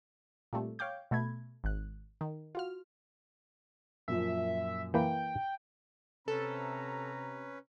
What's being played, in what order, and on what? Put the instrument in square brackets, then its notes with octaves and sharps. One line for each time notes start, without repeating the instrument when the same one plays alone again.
[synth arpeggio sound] A#2 G3 A3 C4
C#5 F5 G5 D6 G6
B2 A3 B5 G#6
G#1 F#6
D#3
F4 F#4 F6
[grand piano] F#2 A#2 F3 [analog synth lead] E5
[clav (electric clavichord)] E3 A#3 B4 [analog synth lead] G5
[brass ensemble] C3 A#5 [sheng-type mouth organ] C#4 B4 [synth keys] A4